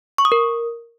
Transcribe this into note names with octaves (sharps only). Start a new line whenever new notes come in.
C#6
D#6
A#4